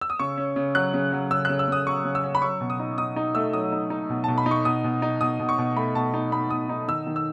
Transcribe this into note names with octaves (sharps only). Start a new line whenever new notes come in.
E6
D#6
C#3 C#6
C#4
C#3
F#3 F#6
C#3
F#3
C#3 E6
C#3 F#6
E6
C#3 D#6
F#3 C#6
C#3
E6
C#4
B5
F#3 C#6
B2
D#6
D#4
D#4 D#6
D#4
A3 E6
F#3 D#6
D#4
D#4
B2
B2 A5
B5
D#4
C#6
B2 D#6
B2
D#4
B2 D#6
B2
C#6
B2
A3 B5
B2 A5
D#4
D#4 B5
B2 D#6
D#4
D#3 E6
D#3
E6